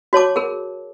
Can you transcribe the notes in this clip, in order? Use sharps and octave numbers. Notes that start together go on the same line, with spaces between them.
F#4 C#5 A5 D6
G#4 A#4